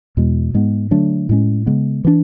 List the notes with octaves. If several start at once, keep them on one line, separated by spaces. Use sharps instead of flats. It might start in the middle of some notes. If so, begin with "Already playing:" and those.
E2 B2 G#3
G#2 G#3 B3
D3 F#3 A3 D4
A2 G#3 C#4
C#3 G#3 B3
E3 B3 D4